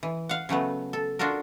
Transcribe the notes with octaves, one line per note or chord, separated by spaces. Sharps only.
E3
F5 F#5
C#3 F#3 A3 B3
A4
D4 F4 F#4 A4 A#4